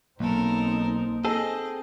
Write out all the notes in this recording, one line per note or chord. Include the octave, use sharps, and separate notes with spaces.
B1 A#3 C4 D#4 A4 A#4
C4 G#4 A4 D#5